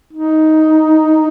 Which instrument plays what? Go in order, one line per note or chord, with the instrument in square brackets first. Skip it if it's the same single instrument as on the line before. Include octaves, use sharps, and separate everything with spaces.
[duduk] D#4